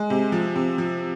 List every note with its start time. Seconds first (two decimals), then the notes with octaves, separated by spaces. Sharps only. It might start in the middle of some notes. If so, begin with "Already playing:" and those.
Already playing: G#3
0.10 C3
0.32 F3
0.56 C3
0.78 F3